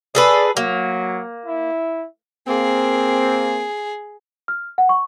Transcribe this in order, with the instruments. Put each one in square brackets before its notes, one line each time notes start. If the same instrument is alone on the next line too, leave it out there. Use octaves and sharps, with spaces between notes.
[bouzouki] G#4 A4 B4 [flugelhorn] D5
[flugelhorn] F#3 [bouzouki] A#3
[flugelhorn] E4
[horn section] A#3 C4 [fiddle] G#4
[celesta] F6
F#5
C#6